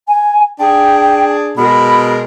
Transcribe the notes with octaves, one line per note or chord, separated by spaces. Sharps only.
G#5
D4 G#4 G5
B2 G#3 A#4 B5